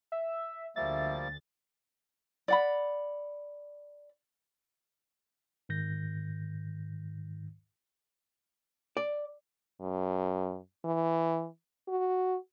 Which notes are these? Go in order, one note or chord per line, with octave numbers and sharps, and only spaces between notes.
E5
D2 F3 G3 A#3 E5 A6
D5 F#5 B5
G#2 D#3 G6 A#6
D5
F#2
E3
F#4